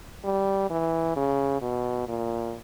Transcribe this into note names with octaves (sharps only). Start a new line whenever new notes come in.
G3
E3
C#3
B2
A#2